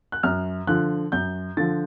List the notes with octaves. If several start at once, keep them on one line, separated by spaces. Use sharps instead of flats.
F#6
F#2 F6
D3 F3 F#6
F#2 G6
D3 F3 A6